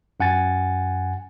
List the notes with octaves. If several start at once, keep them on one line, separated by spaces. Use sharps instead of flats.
F#2 F#5 G#5 A6